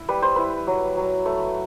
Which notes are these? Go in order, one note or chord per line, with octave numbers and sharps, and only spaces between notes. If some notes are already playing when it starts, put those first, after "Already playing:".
Already playing: E4
G3 B4
C5
E4 B4
F#3
F#3
A3 B4